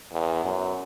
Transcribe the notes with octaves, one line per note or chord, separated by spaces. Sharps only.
E2
F#2